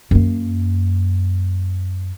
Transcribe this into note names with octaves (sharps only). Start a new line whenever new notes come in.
F#2 A#3